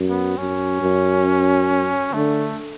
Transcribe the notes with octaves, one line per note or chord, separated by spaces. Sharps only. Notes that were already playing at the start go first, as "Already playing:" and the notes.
Already playing: F#2
B3
F#2 C#4
F#2
D3 A3